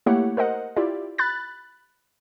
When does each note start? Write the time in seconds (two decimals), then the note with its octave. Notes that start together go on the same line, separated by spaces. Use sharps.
0.06 A3 A#3 E4 G4 C#5 F#5
0.37 A#4 C5 D#5 F#5
0.76 E4 F4 G4 D5
1.18 B5 F#6 A6